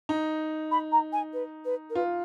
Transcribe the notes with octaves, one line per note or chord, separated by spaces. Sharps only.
D#4
B5
A#5
G#5
B4
B4
A#4
F4 B4